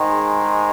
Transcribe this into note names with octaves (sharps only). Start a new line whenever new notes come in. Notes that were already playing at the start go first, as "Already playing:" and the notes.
Already playing: G#2 D#3 G#3